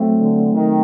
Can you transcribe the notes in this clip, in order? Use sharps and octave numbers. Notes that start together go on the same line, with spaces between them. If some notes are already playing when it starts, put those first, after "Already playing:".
Already playing: F#3 A3 C4
D3
D#3